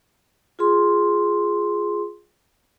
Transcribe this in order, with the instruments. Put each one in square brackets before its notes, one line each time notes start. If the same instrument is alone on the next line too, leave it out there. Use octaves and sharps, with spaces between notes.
[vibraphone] F4 G#4 C6